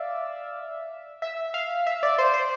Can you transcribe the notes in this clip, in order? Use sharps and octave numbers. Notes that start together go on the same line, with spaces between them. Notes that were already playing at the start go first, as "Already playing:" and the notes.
Already playing: D5 E5 F5
E5
F5
E5
D5
C5
C5